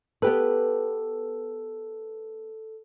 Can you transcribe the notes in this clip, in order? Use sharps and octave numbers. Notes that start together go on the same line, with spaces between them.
B3 G4 A4 B4